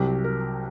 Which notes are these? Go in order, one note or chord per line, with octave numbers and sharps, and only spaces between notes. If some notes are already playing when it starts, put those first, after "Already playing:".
Already playing: C2 C3 F#3 G4
A#4